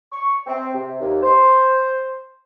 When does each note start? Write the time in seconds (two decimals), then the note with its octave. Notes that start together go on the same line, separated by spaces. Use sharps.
0.12 C#6
0.47 C4
0.75 C3
1.00 D#2
1.23 C5